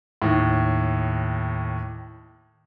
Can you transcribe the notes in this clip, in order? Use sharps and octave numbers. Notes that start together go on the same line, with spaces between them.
D#2 A2